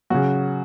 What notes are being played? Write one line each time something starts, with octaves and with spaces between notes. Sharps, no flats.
C#3 F#3 F#4